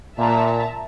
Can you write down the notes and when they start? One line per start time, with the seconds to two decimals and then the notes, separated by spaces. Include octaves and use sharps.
0.18 A#2 E5 A5 A#5